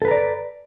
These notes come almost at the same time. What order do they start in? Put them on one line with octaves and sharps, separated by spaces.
A4 B4 A#5 D5